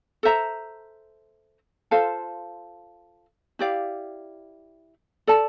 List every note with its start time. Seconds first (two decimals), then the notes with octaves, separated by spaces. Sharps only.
0.23 A4 C5 E5 A#5
1.91 F4 A4 C5 F5
3.59 E4 G4 D5 F5
5.27 A4 D5 A5